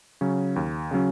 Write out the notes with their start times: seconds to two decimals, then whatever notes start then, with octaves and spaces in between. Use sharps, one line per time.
0.21 C#3 F#3 C#4
0.56 D#2
0.91 C#3 F#3 C#4